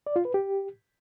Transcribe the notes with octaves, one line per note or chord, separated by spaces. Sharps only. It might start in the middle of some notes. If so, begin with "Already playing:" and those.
D5
F4
B4
G4